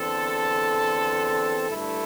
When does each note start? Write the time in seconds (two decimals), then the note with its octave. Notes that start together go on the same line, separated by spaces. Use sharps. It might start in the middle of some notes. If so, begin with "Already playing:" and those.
Already playing: E2 D3 C4 A4
1.70 G2 D3 A3 E4